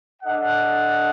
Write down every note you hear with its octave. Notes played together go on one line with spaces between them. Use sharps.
D4 A4 D#5 F#5